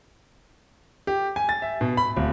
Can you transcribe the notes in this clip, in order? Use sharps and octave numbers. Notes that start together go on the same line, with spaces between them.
G4
G#5
A6
E5
B2
B5
D1